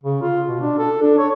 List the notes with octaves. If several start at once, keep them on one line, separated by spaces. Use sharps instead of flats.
C#3
F4
B2
D4
A4
D4
C#5